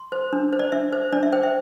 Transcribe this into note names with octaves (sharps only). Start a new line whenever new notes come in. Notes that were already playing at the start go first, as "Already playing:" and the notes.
Already playing: C6
C5
D4
C5
D5
D4 E5
C5
D4 D5
E5
C5 G5
E5